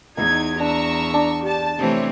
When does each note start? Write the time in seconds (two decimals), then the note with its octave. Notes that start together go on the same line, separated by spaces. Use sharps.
0.17 E2 D#4 A#5 B5 E6 G#6
0.60 D4 A#5 C#6 E6
1.14 D4
1.44 G4 A5
1.78 C3 E3 A3 C4 C5 C#5